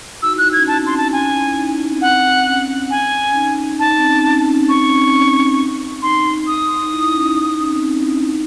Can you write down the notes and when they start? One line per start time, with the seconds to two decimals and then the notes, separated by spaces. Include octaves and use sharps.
0.22 D#4 F#4 E6
0.34 E4
0.38 F#6
0.45 D#4
0.53 C#4 G#6
0.68 C#4 A5
0.79 C4
0.86 C#4 C6
0.97 D#4 A5
1.12 C#4 G#5
1.23 C#4
1.35 E4
1.46 E4
1.57 D#4
1.69 C#4
1.79 C#4
1.90 C4
2.01 C4 F#5
2.46 C#4
2.90 G#5
3.30 C#4
3.35 D#4
3.79 D#4 A5
3.91 D#4
3.97 C4
4.02 C#4
4.13 D#4
4.25 C#4
4.35 D#4
4.47 C#4
4.58 C4
4.69 C4 C#6
4.76 D#4
4.84 C#4
4.99 C4
5.13 C#4
6.02 D#4 C6
6.47 D#6
6.82 D#4
6.92 E4
7.03 E4
7.14 C#4
7.25 D#4
7.36 D#4
7.47 D#4
7.59 C#4
7.69 C4
7.80 C4
7.92 C#4
8.03 E4
8.14 D#4